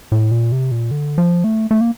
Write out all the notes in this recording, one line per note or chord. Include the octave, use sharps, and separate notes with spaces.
A2
A#2
C3
A#2
D3
F3
A3
A3
A#3